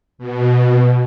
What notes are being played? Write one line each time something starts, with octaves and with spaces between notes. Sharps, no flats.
B2